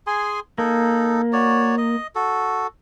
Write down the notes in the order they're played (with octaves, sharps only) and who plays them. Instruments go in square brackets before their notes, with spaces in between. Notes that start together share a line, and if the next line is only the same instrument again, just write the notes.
[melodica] G#4 G#5 C6
[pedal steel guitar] A#3 [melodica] D#4 A4
[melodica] F#4 C#5 D5
D#5
F#4 A4